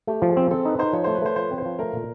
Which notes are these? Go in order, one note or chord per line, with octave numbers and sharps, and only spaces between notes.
A3 G4
F3
G#4
C4
C4 A4
D#4 B4
D#4 C5
F3 C#5
A3 C5
B4
A3 C5
F3 C5
C4
C5
F3
A3 A#4
A#2